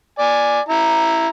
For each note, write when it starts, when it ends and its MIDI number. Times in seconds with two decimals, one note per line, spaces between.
0.19 0.60 74
0.19 0.60 80
0.69 1.28 64
0.69 1.28 82